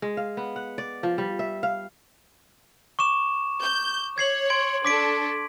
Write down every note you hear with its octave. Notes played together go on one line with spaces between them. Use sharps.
G#3
F5
B3
F#5
D5
F3
G3
E5
F5
C#6 D6 E7
G6
C#5 G#6 C7 F#7
C6 G#6 D7
D4 A4 D6 B6 D7